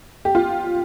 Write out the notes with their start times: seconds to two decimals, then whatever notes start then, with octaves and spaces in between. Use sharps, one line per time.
0.25 G4
0.35 F4